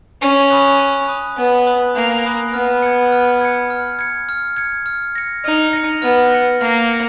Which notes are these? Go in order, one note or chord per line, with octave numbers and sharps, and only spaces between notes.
C#4 G#5
B5 D#6 F#6
G#5
B5 D#6 F#6
B3 G#5
B5 D#6 F#6
A#3 G#5
B5 D#6 F#6
B3 F6
G#6 C#7
F6
G#6 C#7
F6
G#6 C#7
F6
G#6 C#7
F6
A#6 C#7
D#4 F6
A#6 C#7
B3 F6
A#6 C#7
A#3 F6
A#6 C#7